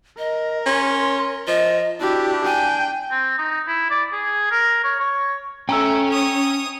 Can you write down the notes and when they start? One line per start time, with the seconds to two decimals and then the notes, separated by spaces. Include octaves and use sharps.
0.18 A#4 D#5
0.66 C#4 C6
1.47 F3 D#5
2.00 D4 E4 F#4 G4
2.45 G5 G#5
3.11 C4
3.38 D#4
3.68 E4
3.91 D5
4.12 G#4
4.51 A#4
4.84 C#5
5.00 C#5
5.69 A3 C#4 G5 A#5 E6
6.09 C#5 D#6